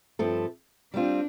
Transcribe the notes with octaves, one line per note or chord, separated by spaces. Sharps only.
G2 F3 C4 E4 A4
G3 C4 D4 F4